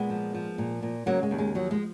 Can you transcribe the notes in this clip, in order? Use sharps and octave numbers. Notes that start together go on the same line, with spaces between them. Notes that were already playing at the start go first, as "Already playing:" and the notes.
Already playing: A#2 G#3 B3
F3
F3
A#2
A#2
C#3 F#3 A#3
G#3
D#2
G#3
F3 F#3
G#3